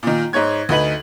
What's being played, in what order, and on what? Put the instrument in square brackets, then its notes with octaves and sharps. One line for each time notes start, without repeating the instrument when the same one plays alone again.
[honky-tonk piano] A#2 D#3
G#2 D#4 C#5 G#6
D2 D#4 B4 F#7